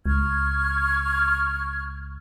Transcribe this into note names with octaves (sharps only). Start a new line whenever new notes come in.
C#2 C#6 F6 G#6